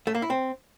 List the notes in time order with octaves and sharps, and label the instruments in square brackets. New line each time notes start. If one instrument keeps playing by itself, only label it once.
[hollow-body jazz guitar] A3
A#3
E4
C4